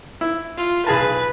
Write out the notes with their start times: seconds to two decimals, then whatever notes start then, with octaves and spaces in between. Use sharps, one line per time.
0.21 E4
0.58 F4
0.87 B1 G#4 B4 A5